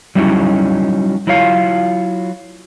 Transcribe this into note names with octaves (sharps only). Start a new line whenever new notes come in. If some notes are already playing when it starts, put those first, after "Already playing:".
F#3 G3 C#4 D#4 E4 F#4
F#3 E4 F4 C#5 F5